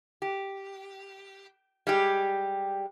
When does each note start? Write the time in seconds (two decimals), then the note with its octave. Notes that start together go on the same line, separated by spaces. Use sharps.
0.22 G4
1.87 G3 G#3 G4